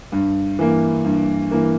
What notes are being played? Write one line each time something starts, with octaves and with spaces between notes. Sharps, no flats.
G2
E3 A#3
G2
E3 A#3